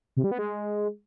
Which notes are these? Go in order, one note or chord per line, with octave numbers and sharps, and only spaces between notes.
C3
G3
B3
G#3